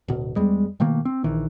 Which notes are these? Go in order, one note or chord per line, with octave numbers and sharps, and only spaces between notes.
D1 B2
E2 G3 G#3
B2 D#3 A3 A#3
C4
A#1 D#3 E3